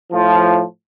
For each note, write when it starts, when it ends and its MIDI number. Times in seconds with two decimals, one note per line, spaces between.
0.12 0.63 45
0.12 0.63 53